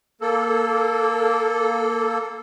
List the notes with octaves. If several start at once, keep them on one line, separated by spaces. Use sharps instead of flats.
A#3 A4